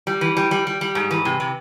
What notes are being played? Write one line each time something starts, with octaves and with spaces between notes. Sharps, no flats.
G3
E3
G3
G3
G3
G3
G#2
E3
C3
C3